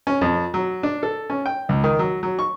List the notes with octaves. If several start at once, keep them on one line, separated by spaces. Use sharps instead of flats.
C#4
F2
F#3
D4
A4
C#4
G5
C#2
D#3
F#3
F#3
C#6